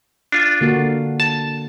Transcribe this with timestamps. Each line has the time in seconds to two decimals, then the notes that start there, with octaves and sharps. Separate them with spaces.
0.32 D4 F4
0.61 D3 A#3 F#4
1.20 A5